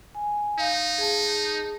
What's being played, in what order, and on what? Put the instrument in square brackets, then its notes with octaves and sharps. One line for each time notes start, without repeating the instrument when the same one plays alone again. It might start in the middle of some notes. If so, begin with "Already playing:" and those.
[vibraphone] G#5
[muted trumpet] D#4 [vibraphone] F5
[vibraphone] G#4 A5